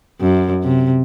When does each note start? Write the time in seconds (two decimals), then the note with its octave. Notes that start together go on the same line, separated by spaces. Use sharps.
0.21 F#2
0.63 C3